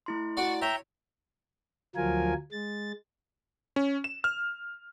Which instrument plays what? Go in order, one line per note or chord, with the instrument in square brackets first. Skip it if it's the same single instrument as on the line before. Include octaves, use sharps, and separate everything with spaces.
[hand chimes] A3 E4 C6
[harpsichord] F#4 D5 [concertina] C#6
[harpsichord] C#5 [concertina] E5 G5 A#5
[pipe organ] D2 F3 F#3 F4 A#4 G#5
G#3 A6
[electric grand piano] C#4
E7
F6